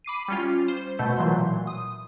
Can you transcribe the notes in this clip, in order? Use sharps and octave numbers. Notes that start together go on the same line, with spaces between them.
B5 D6 C7 D#7
G3 C#4 F4
C5
B2 A3 G6
A#2 E3 F#3 C6
D#6